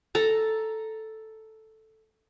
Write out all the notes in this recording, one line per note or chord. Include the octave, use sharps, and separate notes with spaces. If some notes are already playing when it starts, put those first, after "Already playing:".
A4 A#5